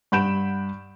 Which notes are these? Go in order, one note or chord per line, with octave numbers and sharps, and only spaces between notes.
G2 F#5 B5 G6 D7 E7